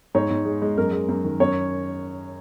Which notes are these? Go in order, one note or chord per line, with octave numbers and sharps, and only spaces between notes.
G#2 C#5
G#2
G#3
G#3
F#2 A#4
G#3
F#2
D#3
F#2 C#5